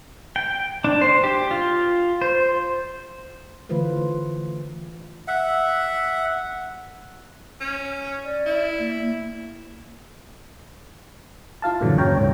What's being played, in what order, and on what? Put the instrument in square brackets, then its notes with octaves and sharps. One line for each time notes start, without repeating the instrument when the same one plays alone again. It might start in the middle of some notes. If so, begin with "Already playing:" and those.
[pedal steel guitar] G5
D4
C5
G4
F4
C5
[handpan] D3 E3 A3 F4 B4 C5
[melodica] E5 F#5
[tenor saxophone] C#4
[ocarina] D5
[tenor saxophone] E4
[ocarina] A#3
[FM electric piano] E4 F4 F5 A5
G2 A#2 D3 E3 F#3
D#2 C#3 C#5 G5 A#5
G#2 C#5